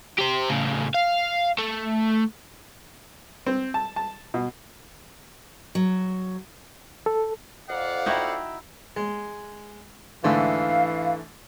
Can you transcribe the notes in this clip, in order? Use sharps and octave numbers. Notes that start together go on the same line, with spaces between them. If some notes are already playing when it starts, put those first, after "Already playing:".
G4 C5
A2 C#3
F5
A3
C4
A5
A5
B2
F#3
A4
F2 D5 F5 F#5
D#4 E4 F#4 E5 G5
G#3
G#2 D3 E3 A3 F5